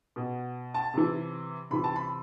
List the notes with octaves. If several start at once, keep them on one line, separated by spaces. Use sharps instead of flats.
B2
A5
C3 E3
C3 E3 B5
A5
B5